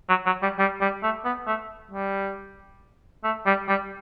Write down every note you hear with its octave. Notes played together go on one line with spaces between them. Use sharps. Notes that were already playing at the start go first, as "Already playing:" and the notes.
F#3
F#3
G3
G3
G3
A3
B3
A3
G3
A3
G3
G3